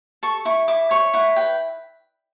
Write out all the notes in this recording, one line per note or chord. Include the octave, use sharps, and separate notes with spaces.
A4 C#6
E4 C#6
E4 D6
C#5 C#6
E4 F#5
B4 G5